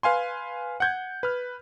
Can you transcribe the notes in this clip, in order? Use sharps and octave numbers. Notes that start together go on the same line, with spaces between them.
B4 F5 G#5 C6
F#5 G6 G#6
B4 F6